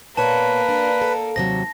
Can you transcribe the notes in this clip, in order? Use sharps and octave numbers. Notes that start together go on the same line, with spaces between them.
A#2 A#3 B3 B4 C#5 A5
D4
A4
D#2 C3 F#3 A#6